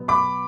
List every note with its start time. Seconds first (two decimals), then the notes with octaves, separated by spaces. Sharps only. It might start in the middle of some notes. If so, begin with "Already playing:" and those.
Already playing: B2 F#3 B3
0.08 B5 D6